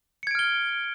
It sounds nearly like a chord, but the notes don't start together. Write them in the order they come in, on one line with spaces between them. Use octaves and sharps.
C#7 G#6 D7 F6 G7